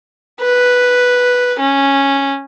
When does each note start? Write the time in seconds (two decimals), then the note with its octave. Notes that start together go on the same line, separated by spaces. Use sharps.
0.40 B4
1.59 C#4